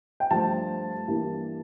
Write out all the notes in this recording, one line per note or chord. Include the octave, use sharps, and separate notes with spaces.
G5
G2 F3 A3 A5
G2 E3 G3 A#3